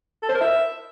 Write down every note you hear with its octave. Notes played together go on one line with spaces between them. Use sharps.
A4
C5
A#4
E5